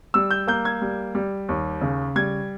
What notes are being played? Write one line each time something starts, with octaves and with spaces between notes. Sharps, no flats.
G3 E6
G6
A#3 G6
G#6
G3
G3
D#2
C#3
G3 G#6